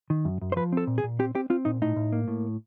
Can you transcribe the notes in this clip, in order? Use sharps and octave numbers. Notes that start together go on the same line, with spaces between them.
D#3
F#2
F#2
C5
F3 B4
C4 A4
A#2
G#4
A#2
C4 G4
C4 G4
C4 F4
A#2 D#4
A2 D#4
A2
A#3
A2